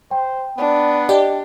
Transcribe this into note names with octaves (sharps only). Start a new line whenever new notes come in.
C5 G5
B3 D4
G4 D5 D#5 G5